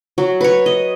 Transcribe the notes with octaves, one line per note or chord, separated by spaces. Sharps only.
F#3
B4 C#5
D#5